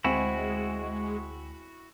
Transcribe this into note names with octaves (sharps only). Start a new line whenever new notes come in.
D2 G#3 C4 E4 F#4 G5 G#5